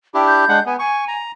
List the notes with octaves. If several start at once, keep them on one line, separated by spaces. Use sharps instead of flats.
D4 E4 G4 G5
G6
G#3 D4 F#5
B3 G#5
G#5 C#6
A#5